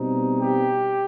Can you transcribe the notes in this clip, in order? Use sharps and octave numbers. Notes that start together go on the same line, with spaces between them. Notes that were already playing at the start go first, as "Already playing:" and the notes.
Already playing: B2 G3 C4 D#4
G4